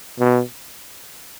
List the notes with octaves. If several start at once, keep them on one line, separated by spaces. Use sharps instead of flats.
B2